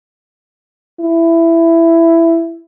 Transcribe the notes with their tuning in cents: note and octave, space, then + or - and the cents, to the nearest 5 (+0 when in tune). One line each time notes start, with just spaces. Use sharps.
E4 +10